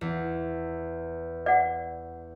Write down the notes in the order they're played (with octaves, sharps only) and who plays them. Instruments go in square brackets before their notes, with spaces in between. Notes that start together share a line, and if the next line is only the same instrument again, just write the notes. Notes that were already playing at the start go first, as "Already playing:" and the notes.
[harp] E2
[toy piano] D5 F#5